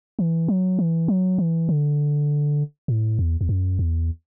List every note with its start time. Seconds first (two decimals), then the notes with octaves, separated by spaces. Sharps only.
0.19 E3
0.48 F#3
0.79 E3
1.08 F#3
1.38 E3
1.69 D3
2.88 A2
3.19 E2
3.41 E2
3.49 F#2
3.79 E2